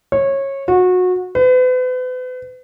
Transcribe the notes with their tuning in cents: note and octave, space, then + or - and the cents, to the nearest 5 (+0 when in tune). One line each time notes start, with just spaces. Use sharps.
C#5 -20
F#4 -25
B4 +40